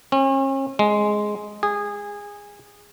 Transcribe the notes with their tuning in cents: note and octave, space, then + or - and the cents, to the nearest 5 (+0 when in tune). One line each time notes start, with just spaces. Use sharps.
C#4 -45
G#3 +5
G#4 -20